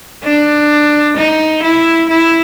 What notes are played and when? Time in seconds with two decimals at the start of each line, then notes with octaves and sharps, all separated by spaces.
0.24 D4
1.17 D#4
1.63 E4
2.10 E4